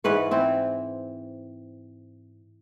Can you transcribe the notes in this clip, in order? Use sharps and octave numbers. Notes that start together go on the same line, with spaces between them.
G#2 E3 B4 C#5
E3 C4 E4